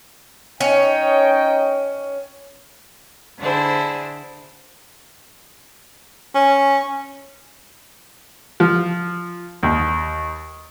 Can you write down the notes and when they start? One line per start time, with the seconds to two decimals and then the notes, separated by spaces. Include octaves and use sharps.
0.61 C#4 D#4 D#5 G5
3.38 D3 D4 E4 G#4 C5
6.35 C#4
8.60 F3
9.63 D#2